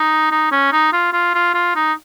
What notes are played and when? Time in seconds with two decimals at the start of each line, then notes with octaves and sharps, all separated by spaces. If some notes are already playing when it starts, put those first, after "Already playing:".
Already playing: D#4
0.31 D#4
0.51 C#4
0.72 D#4
0.93 F4
1.13 F4
1.34 F4
1.54 F4
1.76 D#4